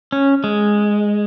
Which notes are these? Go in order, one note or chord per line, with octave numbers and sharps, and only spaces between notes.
C#4
G#3